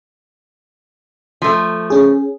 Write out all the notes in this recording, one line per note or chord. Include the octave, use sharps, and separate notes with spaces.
F3 A3
C#4 G#4